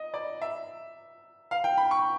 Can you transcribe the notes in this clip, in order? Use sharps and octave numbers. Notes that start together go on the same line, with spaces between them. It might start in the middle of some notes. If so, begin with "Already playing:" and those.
Already playing: D#5
D5
E5
F5
G5
B5
C#6